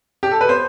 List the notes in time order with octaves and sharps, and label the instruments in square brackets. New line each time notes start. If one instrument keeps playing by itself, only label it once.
[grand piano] G4
A4
B4
B3 C5